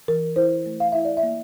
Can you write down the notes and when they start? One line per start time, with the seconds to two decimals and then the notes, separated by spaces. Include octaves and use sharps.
0.08 E3 A#4
0.36 E4 C5
0.66 A3
0.80 F5
0.92 E4 E5
1.05 D5
1.17 E5
1.23 A#3